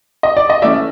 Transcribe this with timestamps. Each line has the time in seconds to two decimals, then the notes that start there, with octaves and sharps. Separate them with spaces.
0.23 D#5
0.37 D5
0.50 D#5
0.62 E3 A3 C#4 D5 E5